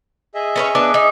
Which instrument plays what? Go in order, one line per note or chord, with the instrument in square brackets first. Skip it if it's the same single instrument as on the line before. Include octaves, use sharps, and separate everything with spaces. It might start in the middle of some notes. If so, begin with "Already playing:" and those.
[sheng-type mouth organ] G#4 D#5 E5
[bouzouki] C#4 B4 C#5
[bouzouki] B3 D4 [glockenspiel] D6
[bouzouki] D#4